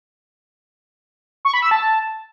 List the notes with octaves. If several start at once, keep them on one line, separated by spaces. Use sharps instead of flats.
C#6
B5
E6
A5